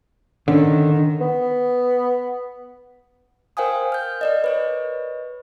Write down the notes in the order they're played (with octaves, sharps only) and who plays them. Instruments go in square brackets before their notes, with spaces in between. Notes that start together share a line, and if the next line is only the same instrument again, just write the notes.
[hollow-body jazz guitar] D3 C#4 [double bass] D#3
[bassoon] B3
[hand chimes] A#4 C5 F5 G5 G#5 D#6
F6 G6
A#4 D5 D#5
B4 C#5 D#5